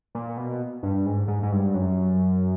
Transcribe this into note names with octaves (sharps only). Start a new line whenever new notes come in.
A#2
B2
G2
G#2
G#2
G#2
G2
F#2